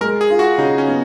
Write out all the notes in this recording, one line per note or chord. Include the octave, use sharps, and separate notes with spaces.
G#3 A#4
G#4
F4
F#4
C#3 D#4
C#4
B3